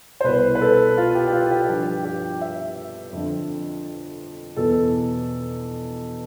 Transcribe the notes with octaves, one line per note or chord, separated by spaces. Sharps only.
C5
C2 B2 B4
B4
A4
F4
G4
G4
F4
G4
G2 F3 G4
G4
E5
F2 D3 F3
E2 B2 A4